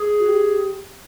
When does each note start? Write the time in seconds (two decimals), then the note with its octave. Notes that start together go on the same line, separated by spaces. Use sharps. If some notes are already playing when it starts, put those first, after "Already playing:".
Already playing: G#4
0.19 F#4
0.27 G4